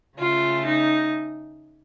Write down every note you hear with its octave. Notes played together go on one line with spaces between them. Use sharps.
C#3 A3 F4
D#4